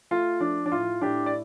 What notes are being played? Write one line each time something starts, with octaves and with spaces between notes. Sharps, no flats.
A3 F4
F3 D4
D4
A2 F4
A2 D4 G4
D5